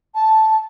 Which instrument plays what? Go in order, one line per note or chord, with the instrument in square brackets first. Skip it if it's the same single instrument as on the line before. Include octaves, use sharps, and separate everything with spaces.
[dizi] A5